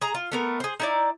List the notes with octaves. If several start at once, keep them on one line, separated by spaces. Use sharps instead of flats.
G#4 A#5
F4
A3 B3 A#4
G#4 C5
D#4 E4 D5